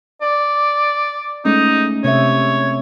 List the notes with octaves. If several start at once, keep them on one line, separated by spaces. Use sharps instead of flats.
D5
G#3 A3 C#4 D#4
C3 C4 C#5 E5